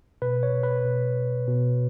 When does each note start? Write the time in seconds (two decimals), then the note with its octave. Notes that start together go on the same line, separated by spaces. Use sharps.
0.22 B2 B4
0.43 C#5
0.53 B2
0.63 B4
0.84 B2
1.16 B2
1.48 B2